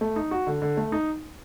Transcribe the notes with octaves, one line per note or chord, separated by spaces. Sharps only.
A3
D#4
F#4
D3
D3
A3
D#4